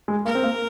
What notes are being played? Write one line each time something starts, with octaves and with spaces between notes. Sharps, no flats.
G#3
A#3 A#4
C4
A#3